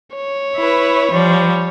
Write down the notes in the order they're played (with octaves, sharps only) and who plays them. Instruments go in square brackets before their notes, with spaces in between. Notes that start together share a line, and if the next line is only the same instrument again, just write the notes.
[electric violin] C#5
[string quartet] E4 B4
F3 G3